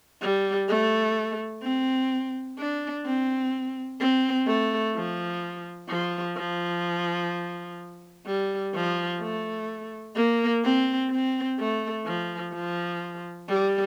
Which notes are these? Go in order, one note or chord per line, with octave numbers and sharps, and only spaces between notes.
G3
A3
C4
D4
C4
C4
A3
F3
F3
F3
G3
F3
A3
A#3
C4
C4
A3
F3
F3
G3